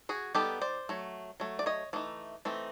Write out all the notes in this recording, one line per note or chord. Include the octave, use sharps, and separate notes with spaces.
F#4 G#4
G3 B3 D#4 G4 A4
C5 D5
F#3 A3
F#3 A3
D5
C#5 D#5
E3 A3 D#4
E3 A3 C4 D#4